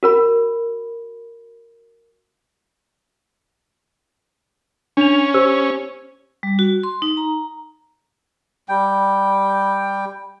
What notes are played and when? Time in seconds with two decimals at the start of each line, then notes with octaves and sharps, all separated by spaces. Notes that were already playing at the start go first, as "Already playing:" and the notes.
0.03 F#4 A#4 B5
4.97 C#4 D4 F7
5.34 G4 C5 E6
6.43 G3
6.59 F#4
6.83 C6
7.02 D#4
7.17 A#5
8.69 G3 G5